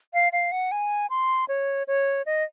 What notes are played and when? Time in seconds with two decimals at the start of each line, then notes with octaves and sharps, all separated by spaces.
0.14 F5
0.33 F5
0.52 F#5
0.72 G#5
1.10 C6
1.48 C#5
1.88 C#5
2.26 D#5